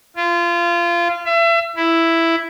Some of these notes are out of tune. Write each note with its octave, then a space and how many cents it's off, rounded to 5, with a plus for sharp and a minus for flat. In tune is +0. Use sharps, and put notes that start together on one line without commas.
F4 -25
E5 +35
E4 +5